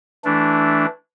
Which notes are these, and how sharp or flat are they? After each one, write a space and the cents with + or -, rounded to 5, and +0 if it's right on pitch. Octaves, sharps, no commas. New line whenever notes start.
E3 +0 A3 -5 D4 -10